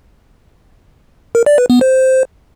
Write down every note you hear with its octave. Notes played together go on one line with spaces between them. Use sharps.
A#4
D5
B4
B3
C5